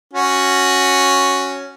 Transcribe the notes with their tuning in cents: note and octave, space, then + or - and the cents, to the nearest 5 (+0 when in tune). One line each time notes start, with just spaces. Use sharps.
C#4 +0 F#4 +0